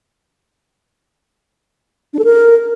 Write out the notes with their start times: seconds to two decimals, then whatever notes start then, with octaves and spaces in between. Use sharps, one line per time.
2.13 D4
2.19 A4
2.24 A#4